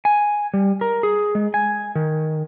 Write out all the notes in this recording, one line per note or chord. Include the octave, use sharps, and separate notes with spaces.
G#5
G3
A#4
G#4
G#3
G#5
D#3